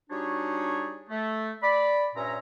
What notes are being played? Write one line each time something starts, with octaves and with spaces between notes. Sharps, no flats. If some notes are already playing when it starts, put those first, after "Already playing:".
G3 D4 D#4 F#4 G#4 C#5
A3
D5 B5
G2 A#2 C#4 C#5 E5 A#5